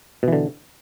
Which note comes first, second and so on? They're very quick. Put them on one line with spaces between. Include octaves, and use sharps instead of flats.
B2 E3 D3